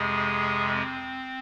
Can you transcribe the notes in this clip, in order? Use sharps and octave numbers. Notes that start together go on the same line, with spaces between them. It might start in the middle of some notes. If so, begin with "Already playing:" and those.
Already playing: F2 C3 G#3 G#4
C4